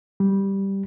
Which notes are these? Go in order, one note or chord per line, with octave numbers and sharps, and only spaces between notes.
G3